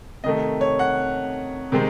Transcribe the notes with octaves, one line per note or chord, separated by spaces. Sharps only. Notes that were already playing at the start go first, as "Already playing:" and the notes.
C3 D#3 A3 D#5
C#5
F#5
C3 D#3 G#3 C4